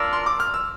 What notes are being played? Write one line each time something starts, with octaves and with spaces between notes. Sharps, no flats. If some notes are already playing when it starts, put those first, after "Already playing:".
Already playing: D4 F4 A#4 D5 E6
C6
D6
F6
E6